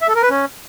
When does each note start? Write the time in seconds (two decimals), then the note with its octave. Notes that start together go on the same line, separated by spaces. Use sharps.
0.01 E5
0.08 A4
0.15 A#4
0.22 B4
0.30 C#4